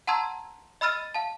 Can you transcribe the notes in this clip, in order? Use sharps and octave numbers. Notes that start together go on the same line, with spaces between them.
F#5 A5 A#5 C6 E6 G#6
D#5 B5 E6 F6 A6 D#7
F5 A5